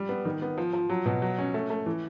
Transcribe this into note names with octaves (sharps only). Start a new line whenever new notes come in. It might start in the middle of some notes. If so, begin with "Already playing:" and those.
Already playing: G3
B3
D#3
B3
F3
F3
F#3
B2
F#3
C#4
A3
A3
E3